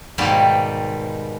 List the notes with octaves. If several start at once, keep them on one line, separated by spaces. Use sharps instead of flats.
G#2 B2 D#3 G3 A#3 C4